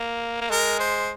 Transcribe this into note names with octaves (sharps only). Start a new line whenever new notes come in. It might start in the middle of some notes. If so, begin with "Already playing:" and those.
Already playing: A#3
A#3
G#3 A#4
C5